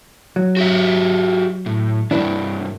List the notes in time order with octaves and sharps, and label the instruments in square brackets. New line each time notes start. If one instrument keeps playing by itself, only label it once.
[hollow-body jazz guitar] F#3
[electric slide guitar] F#4 G4 E5
A2
[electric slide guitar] G2 E3 [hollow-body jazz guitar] D4 E4 B4